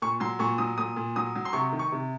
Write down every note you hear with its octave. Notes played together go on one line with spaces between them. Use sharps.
A#2 C#6
F#3 C6
A#2 C#6
F#3 D#6
A#2 D#6
A#2
F#3 D#6
F#3
C6
C3 C#6
D#3
C#6
C3